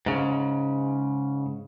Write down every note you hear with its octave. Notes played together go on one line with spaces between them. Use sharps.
G#2 C#3